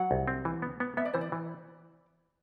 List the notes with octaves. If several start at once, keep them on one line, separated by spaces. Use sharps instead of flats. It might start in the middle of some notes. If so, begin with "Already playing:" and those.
Already playing: F#3 F#5
C2
C4
E3
B3
B3
B3 E5
D5
E3 C5
D5
E3